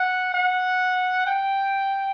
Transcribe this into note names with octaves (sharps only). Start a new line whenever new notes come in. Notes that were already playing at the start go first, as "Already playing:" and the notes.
Already playing: F#5
F#5
G5